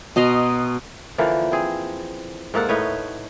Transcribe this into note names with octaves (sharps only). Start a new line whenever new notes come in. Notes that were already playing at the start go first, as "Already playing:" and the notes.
B2 D#5 A#5 C6
D3 E3 F3 A#3
C4 G#4
G#2 A#3 A4 F#5
A2 D#4 B4 C#5